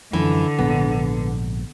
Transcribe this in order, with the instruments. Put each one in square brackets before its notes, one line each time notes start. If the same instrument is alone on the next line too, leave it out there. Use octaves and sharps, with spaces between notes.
[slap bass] F#2 F3 [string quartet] D3 [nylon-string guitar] E3
[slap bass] A#1 G#2 [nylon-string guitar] B3